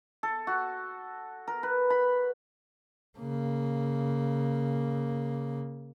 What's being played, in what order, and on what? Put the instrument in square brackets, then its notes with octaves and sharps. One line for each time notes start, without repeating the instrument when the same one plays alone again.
[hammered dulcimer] A4
F#4
A#4
B4
B5
[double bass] C#3 A#3